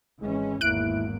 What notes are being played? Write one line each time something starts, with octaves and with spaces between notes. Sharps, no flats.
G#1 E3 G#3 C#4
G#1 E2 A#3 E4 F#6 D7